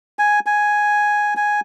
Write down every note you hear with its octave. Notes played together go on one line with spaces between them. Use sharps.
G#5
G#5
G#5